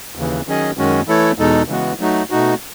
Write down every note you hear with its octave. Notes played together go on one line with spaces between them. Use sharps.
D#2 C#3 E3
D#3 F#3 C#4 G#4 D#5
F#2 D#3 G#3 C#4 F#4
E3 A3 E4 A4 C#5
E2 B2 G#3 D#4 A4
C#3 E3 G#3 B3 F#4
F#3 A3 D#4 F#4
B2 A3 D#4 F#4